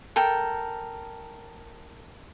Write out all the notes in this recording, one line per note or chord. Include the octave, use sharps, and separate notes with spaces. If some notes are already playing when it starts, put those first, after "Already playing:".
A4 A#4 G5